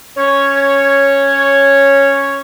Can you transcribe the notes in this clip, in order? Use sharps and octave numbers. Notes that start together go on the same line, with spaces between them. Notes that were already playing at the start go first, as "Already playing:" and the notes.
C#4 C#5